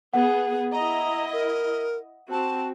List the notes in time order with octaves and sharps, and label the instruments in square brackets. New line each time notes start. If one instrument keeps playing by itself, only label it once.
[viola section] B3 G#4 [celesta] F#5
[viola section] E4 D#5 [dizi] A#5
[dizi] A#4
[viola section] C4 F#4 [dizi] A5